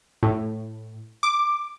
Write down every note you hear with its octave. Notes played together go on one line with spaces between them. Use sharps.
A2
D6